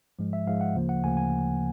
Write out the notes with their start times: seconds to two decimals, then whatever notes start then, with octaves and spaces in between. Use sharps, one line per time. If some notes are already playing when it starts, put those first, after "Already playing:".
0.19 G#2 F3 G#3
0.33 E5
0.46 G#2 F3 G#3 F5
0.61 F#5
0.75 D2 C#3 F3 A#3
0.89 F#5
1.03 D2 C#3 F3 A#3 G#5
1.17 G#5